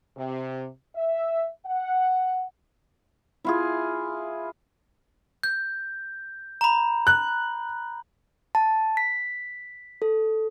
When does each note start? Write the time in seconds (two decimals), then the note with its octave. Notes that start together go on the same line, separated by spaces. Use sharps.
0.17 C3
0.96 E5
1.66 F#5
3.44 E4 F4 G#4
5.43 G6
6.61 A#5 B5
7.07 F#6
8.55 A5
8.97 B6
10.02 A4